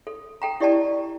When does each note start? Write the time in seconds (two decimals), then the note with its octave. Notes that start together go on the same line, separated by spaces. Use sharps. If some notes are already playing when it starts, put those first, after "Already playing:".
0.07 A4
0.42 A4 G5 A#5
0.60 E4 G4 D5 D#5 G5 A5